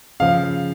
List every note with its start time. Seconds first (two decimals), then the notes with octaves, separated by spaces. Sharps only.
0.20 C#3 F3 F5